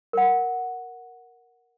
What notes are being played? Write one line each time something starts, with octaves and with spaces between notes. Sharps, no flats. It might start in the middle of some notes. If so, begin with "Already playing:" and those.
A#4 F#5